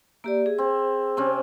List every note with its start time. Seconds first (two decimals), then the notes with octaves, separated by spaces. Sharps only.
0.24 A#3 G4 D5 E5
0.46 G#4
0.58 C4
1.17 C3 C4 C#4